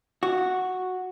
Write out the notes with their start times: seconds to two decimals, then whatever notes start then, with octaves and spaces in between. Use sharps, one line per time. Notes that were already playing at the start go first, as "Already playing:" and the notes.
0.23 F#4